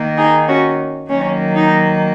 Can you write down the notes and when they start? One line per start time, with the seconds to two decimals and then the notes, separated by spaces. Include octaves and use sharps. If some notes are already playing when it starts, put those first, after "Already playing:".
Already playing: D#3 A#3
0.17 D#4 G#4
0.48 C#4 F#4
1.10 D#3 F#3 A#3 C#4
1.55 D#4